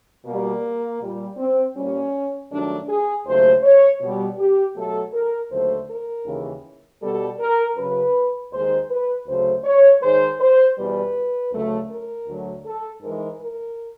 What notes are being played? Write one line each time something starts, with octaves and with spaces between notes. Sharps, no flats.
B2 G3 A#3
A#2 G3
C4
A#2 G3 C#4
G2 D#3 F#3 A3 D4
G#4
D#2 C#3 F#3 A3 C5
C#5
B2 G3
G4
B2 F#3 A3 A4
A#4
D#2 D3 F#3 A3 C5
A#4
D#2 C#3 E3
B2 G3 A4
A#4
F#2 C#3 F#3 B4
D#2 D#3 G#3 C5
B4
D2 C#3 F#3 A3 C5
C#5
G#2 D#3 G#3 C5
C5
E2 B2 G3 B4
D2 C#3 F#3 A3
A#4
D2 D3 F#3 A3
A4
G#2 E3 G#3 A#4
A#4